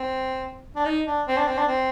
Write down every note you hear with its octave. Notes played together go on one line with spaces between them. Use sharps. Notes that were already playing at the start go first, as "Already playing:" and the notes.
Already playing: C4
D4
D#4
D4
C4
D4
C4
D4
C4